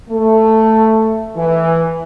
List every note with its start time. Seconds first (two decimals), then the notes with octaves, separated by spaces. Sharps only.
0.10 A3
1.36 E3